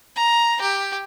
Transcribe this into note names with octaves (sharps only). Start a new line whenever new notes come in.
A#5
G4